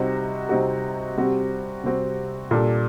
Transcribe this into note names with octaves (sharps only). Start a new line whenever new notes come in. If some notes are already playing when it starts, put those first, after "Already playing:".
Already playing: C3 G3 C4 D#4 F#4
C3 G3 C4 D#4 F#4
C3 G3 C4 F#4
C3 G3 C4 F#4
A#2 G3 D4 A4